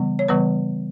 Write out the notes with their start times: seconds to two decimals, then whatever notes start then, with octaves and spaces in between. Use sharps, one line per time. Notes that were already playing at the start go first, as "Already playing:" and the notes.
Already playing: C#3 E3 G3 B3
0.19 C#5
0.28 C#3 E3 G3 B3 B4